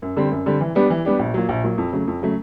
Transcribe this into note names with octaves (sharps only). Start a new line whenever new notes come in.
F#2
D3 G3 C4
F#2
D3 G3 C4
E3
G3 B3 D4 G4
E3
G3 B3 D4 G4
A#1
A#2 F#3
A#1
A#2 F#3
F2
C#3 F#3 A3
F2
C#3 F#3 A3